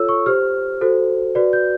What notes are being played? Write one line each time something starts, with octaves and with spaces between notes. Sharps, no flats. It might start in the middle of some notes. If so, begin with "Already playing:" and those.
Already playing: F4 A4 C#5 E6
C#6
G4 C5 F6
F#4 A4 C5
F#4 B4 D5
G6